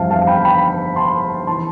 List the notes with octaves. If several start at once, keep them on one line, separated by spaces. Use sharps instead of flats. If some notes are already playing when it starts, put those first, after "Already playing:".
Already playing: G1 F2 E3 G3 C5 E5 F5 A5
F5 A5
G5 B5
G5 B5
A5 C6
E3 A5 C6